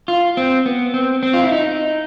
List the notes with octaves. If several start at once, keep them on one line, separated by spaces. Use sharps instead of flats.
F4
C4
B3
C4
C4
F4
E4
D#4